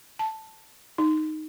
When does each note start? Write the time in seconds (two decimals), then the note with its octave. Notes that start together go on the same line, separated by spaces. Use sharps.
0.19 A5
0.98 D#4